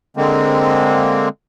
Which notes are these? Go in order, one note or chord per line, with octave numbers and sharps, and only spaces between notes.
D3 G#3 A#3 C4